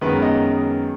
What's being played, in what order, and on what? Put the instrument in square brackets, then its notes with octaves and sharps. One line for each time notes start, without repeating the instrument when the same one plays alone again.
[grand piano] F#2 D#3 G#3 B3 B4
D#5